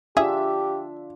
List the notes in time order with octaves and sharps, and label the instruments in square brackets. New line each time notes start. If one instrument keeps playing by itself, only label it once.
[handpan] D4 F4 [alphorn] G4 [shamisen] G#4 [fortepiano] E5